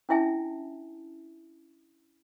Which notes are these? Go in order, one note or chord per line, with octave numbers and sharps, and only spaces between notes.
C#4 D4 E4 E5 G#5 A5